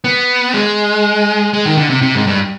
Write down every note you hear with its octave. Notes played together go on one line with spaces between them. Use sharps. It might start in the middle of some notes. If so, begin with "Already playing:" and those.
B3
G#3
G#3
D#3
D3
C3
C3
G#2
G2